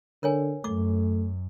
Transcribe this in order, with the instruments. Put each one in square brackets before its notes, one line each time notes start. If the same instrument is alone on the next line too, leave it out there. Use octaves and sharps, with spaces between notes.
[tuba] D3 [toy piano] A#4 C#5 G#5
[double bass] F#2 [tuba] A3 [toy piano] D6